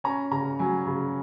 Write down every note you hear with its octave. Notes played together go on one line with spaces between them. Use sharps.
C#4 A#5
C#3 A#5
F#3 G#5
C#3